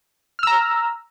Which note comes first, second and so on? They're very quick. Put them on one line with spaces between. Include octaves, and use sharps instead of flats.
F6 E6 A#5